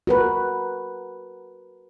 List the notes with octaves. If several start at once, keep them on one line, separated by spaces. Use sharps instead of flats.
F#4 A#4 B4